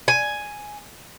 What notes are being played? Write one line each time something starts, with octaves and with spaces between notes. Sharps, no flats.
G#5